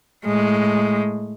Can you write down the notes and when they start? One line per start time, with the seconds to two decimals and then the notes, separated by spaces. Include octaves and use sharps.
0.25 A2 G#3